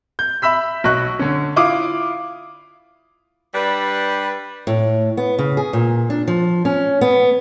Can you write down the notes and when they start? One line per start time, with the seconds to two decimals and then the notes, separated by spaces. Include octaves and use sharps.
0.19 G6
0.42 E5 B5 E6 B6
0.84 B1 D#5 C#6 F#6
1.19 D3 C#4
1.56 E4 F4 F5 D6 D#6
3.54 G3 D4 B4
4.67 A2
5.17 B3
5.39 C#3
5.57 G#4
5.73 A#2
6.10 D4
6.28 F3
6.65 C#4
7.01 B3